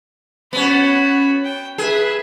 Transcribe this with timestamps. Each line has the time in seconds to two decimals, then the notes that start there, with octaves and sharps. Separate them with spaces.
0.53 B3 C#4 F#4 B5
1.45 G5
1.78 G#4 B4 E5